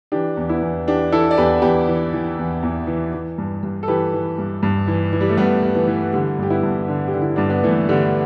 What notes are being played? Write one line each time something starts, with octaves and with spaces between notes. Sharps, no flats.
E3 D4 G4
E2
B3 E4
E2
E3 D4 G4
E3 E4 A4
D5
E2 G4 B4
E2 G4 B4
E3
E3
E2
E2
E3
E3
G2
G2
A4
E3 G4 B4
E3
G2
G2
E3
E3
G3
A3
G2 G3 B3
G2
E3 A3
E3
D3 G3
G2 G4
B3 E4
G2
D3
G4
D3
E4
G2 D4
B3
G2 E3 A3
D3 G3